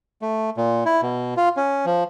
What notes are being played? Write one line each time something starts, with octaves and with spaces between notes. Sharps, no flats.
A3
A#2
E4
B2
F4
C#4
F3